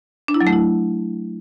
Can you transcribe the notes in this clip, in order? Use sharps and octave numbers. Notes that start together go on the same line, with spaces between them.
D4
E4
F#3
A3
E4